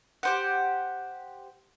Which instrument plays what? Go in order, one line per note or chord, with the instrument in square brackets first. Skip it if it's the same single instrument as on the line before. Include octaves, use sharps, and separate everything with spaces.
[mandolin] G4 C5 F#5